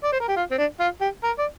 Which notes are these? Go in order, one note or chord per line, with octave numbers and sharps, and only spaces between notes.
D5
C5
A#4
G4
F4
C4
D4
F4
G4
A#4
D5